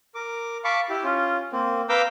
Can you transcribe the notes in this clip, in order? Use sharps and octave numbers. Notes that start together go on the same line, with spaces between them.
A#4 D6
F5 A5 B5 C#6 D6
E4 G4
C#4 F4
A#3 C4
B4 F5 A#5 D6 E6 G6